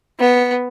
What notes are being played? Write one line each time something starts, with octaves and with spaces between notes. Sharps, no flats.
B3